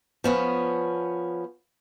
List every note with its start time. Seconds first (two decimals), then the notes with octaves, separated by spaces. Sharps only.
0.24 F3 B3 C#4